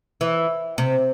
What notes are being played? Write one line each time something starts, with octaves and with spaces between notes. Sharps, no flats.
E3
C3